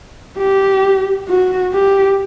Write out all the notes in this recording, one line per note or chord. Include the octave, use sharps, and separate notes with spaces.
G4
F#4
G4